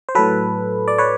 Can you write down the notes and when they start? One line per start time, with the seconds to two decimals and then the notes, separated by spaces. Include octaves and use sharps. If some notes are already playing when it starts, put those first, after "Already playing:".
0.09 C5
0.15 A2 F#3 A4 B4
0.88 D5
0.98 B4 C#5